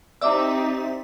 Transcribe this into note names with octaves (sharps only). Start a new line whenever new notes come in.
C4 D#4 E4 G4 D5 E5 D6 E6